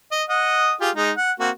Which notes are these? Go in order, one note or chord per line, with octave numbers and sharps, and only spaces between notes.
D#5
D#5 F#5 D#6
F4 G4 G#4
G#3 D#4
F#5
A#3 C4 F#4